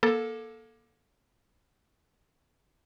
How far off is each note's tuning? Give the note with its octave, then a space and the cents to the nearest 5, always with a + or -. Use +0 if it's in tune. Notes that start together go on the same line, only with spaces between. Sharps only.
A#3 +30 A4 +0